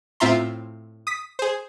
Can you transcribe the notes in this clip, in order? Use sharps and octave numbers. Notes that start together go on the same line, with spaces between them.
A2 C4 F4 E5 A#5 C6
D#6 B6
G#4 C5